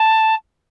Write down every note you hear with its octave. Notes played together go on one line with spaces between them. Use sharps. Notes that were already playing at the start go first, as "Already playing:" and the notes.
Already playing: A5